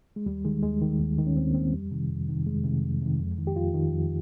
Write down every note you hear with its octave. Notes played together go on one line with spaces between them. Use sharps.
G#3
D#2 G3
D#3 G#3
D#2 G#3
D#3
D#2
D#3
C#4
D#2 C4
A#3
D#3 C4
F2 G3
C3 D#3
F2
C3 D#3
F2 G#3
C3 D#3
F2
C3 D#3
F2
D#3
G4
F2 F4
D#3
F2